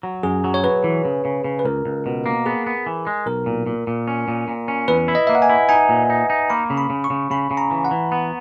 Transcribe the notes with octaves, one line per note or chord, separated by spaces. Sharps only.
F#3
F#2 G#4
F#3
C#5
F#3 B4
E3
C#3
C#3
C#3
B4
C#2 A#4
C#2
B2
A#3
B3 G#4
B3
E3
G#3
B1 A#4
A#2
A#2
A#2
C#4
A#2
A#2
C#4
E2 B4
E4
D#5
A#3 E5
F#5
G#5
E4
D#4 G#5
A#2
D#4
D#4
A#3 B5
C#3
B5
C#3
C#6
C#3
C#3 B5
C#3
A#5
E3
F#5
E3
B3